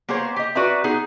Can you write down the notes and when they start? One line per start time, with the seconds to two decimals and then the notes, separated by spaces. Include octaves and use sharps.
0.09 A#3 B3 G#4 C5 C#5
0.36 G4 D#5
0.55 F#4 B4 D5 E5 A#5
0.84 B3 D#4 G#4